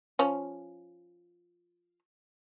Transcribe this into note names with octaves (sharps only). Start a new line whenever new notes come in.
F3 C#4